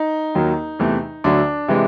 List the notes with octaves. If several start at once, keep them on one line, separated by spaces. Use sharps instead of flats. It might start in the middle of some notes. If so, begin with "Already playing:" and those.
Already playing: D#4
D#2 D#3 F#3
E2 C3 E3 A3
D2 D3 F#3 D4
C3 E3 G#3